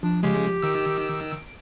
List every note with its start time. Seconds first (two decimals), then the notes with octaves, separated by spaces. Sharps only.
0.03 F3 D4
0.23 C#3 G#3 G4
0.62 D#3 E6 D7